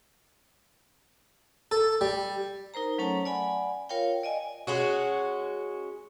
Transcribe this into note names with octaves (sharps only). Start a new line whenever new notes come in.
A4
G3
D#4 A#4 C5 A#5
F#3 A3 C#4 A4 C#5 A5
D5 F#5 G#5 B5
F4 A#4 C#5 F5 G5
D5 D#5 G#5
G#3 C#4 F#4